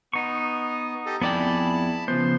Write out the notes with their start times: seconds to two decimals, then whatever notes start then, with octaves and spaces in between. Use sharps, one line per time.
0.13 B3 D#4 C#6
1.06 G4 A4 D#5
1.22 F2 B3 E4 G#4 D5 G5 A5 B5
2.08 C#3 F3 B3 C5